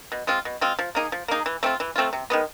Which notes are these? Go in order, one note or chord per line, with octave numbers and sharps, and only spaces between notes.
B2
G#3 C4 F4
B2
G#3 C4 F4
F3
A#3 D#4 G#4
F3
A#3 D#4 G#4
E3
A3 C4 F4
E3
A3 C4 F4
C3
D#3 G#3 B3